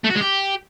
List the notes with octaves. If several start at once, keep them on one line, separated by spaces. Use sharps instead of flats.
A3
F#4
G#3
G4